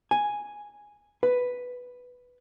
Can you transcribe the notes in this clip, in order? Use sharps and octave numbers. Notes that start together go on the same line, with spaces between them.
G#5
B4